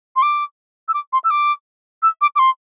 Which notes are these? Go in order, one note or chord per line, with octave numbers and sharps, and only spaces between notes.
C6
D6
E6
D6
C6
E6
D6
E6
D6
D6
C6